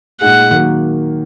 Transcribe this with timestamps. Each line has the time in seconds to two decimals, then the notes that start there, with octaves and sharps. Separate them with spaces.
0.21 A#2 G#3 D#4 G#4 F#5
0.51 D#3 F#3 A#3